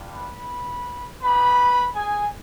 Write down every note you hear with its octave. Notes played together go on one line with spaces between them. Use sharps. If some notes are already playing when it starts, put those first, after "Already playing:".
Already playing: G3 D4 F4
B4 B5
B3 D#4 G4 B4 B5
G#4 G#5